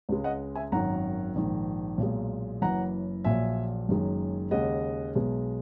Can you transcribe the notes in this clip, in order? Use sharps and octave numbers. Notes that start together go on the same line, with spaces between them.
C#2 C#3 G#3
D#5 F#5
E5 G#5
G#1 F#2 D#3 F#5 A#5
A#1 G#2 D#3
B1 A#2 G#3
F#1 F#2 E3 F#5 A#5
A#1 A#2 F#3 E5 G#5
F#1 F#2 D#3 G#3
D#2 C#3 G#3 D#5 F#5
B1 B2 G#3